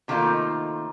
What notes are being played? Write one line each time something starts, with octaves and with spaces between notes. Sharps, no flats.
C3 D#3 A3 A#3 D#4 F4